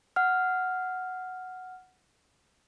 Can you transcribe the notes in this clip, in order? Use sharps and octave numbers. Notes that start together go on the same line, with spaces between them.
F#5 F6